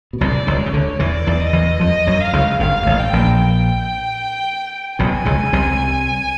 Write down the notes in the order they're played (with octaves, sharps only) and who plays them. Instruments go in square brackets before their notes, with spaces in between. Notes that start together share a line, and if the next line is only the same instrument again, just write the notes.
[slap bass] B2
[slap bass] C2 C3 [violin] D5
[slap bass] C#2 C#3
[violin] C#5
[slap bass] C#3
D2 D3
[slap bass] E2 E3 [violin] D5
[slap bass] E2 E3
[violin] D#5
[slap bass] E2 E3
[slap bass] F2 F3 [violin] D#5
[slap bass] F#2 F#3
[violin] F5
[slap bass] C#2 C#3
[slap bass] G1 G2 [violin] F5
[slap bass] G#2
A1 A2
[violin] G5
[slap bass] A#1 A#2
[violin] G5
[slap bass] B1 B2 [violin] G#5
[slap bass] C#2 C#3
C2 C3